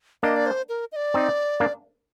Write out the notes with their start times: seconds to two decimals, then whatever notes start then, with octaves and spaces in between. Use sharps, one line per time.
0.23 A#3 D4 D#5
0.36 D5
0.46 C5
0.69 A#4
0.92 D#5
0.96 D5
1.14 C4 D#4
1.60 A#3 D4